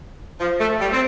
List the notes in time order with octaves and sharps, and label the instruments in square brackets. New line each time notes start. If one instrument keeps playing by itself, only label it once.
[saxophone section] F3
A3
G3
C4